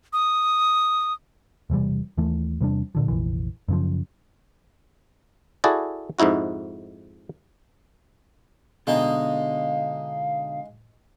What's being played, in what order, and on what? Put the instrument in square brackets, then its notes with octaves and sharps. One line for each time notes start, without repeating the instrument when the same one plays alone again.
[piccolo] D#6
[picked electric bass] E1 C3 E3 G3
D#2 E3 A3
E2 C3 G3 D4
A#2 D3 F3
F1 A#1 E3
F#2 C#3 F3
[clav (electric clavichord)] E4 F#4 G#4 A4 D5
F2 G#2 D#4 E4 F#4
[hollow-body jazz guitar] B2 D3 [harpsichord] G#3 D#4 [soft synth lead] F5